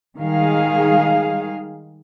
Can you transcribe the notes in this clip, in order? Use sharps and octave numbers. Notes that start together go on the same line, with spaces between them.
D#3 G3 G#3 G#4 F5